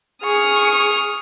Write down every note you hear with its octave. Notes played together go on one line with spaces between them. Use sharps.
G#4 C#6 D#6 F6